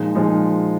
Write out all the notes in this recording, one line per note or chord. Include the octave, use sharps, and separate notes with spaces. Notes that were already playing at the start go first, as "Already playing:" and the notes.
Already playing: A#2 F3 G#3 D#4
A#2 F3 G#3 D#4